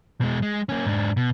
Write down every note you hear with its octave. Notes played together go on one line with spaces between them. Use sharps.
B2 G#3
G#3
A#3 C#4
G#2 D4
B2